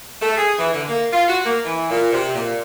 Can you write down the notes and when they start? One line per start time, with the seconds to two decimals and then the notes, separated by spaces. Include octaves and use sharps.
0.21 A3
0.37 G#4
0.59 E3
0.73 D3
0.88 A#3
1.12 F4
1.29 F#4
1.45 A#3
1.64 E3
1.90 A#2
2.12 C3
2.35 A#2